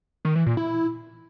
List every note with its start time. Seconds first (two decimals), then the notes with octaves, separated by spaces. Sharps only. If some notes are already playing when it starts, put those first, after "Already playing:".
0.25 D#3
0.35 E3
0.46 A#2
0.57 E4